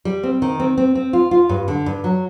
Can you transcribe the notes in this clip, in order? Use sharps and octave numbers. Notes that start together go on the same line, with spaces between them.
G3
C4
D#3
C4
C4
C4
F4
F4
G2
D3
G2
F#3